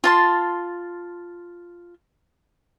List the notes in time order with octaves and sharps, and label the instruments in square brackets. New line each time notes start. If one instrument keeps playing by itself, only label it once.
[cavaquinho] F4 A5 C6